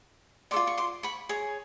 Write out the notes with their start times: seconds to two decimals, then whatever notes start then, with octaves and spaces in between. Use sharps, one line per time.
0.51 A4 D5 C6 D6
0.56 F4
0.67 C#6
0.78 C6 D6
1.03 B5 C#6
1.29 G#4 C#5